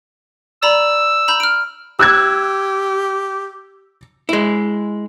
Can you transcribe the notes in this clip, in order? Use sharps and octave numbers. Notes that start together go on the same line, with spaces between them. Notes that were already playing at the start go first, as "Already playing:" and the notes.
D5 A#5 B5 E6
A#5 B5 G6
F6 D7
G4 E6 F#6 G#6
G#3 E4